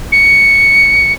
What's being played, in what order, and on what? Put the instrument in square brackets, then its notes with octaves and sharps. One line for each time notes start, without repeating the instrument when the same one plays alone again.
[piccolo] C#7